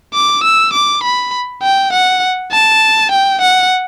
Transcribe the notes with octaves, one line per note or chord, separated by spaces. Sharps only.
D6
E6
D6
B5
G5
F#5
A5
G5
F#5